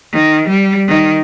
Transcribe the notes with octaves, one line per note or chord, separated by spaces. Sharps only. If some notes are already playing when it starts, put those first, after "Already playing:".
D#3
G3
D#3